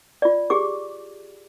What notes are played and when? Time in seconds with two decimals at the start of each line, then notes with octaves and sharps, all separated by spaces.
0.22 F4 D5
0.50 G4 G#4 D6